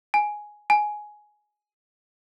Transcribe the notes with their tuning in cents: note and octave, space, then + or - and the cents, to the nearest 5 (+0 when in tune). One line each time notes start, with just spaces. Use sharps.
G#5 +5
G#5 +10